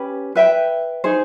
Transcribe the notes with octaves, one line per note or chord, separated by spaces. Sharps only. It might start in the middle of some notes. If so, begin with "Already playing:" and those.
Already playing: C#4 G4 B4
B4 E5 G5
D#4 G#4 C5